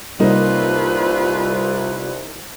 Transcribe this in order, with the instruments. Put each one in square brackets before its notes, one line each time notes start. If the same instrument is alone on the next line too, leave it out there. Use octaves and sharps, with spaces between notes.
[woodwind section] C2 [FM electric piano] C3 G3 [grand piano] A#3 D#4 [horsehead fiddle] F4 B4